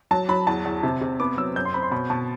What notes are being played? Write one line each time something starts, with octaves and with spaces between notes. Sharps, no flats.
F#3 A5
F#3 B5
E2 A5
E2
C3
C3
B3 D6
F#3 E6
F#2 G6
C6
C4 B5
C6
B2 B5
B2 A5